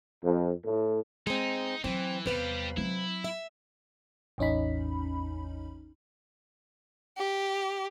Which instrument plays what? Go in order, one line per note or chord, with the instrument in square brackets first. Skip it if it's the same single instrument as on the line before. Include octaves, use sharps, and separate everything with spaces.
[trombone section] F2
A2
[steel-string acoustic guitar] G#3 C4 [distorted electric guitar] D#4
[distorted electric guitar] E3 [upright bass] F#3 [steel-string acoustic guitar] C4
[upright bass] E2 [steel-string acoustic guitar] C3 B4 F5 [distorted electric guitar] G3 G4
[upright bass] F#3 C4 [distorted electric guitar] E4
[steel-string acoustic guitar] E5
[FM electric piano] A1 E2 C#4 D#4 B5
[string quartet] G4